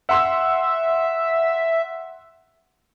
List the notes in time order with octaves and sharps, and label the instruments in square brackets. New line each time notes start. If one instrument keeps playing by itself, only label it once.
[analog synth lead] E5 [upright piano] F#5 C6 E6